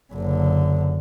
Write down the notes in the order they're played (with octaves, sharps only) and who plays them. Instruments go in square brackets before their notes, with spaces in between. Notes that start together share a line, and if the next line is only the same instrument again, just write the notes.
[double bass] F#1 D3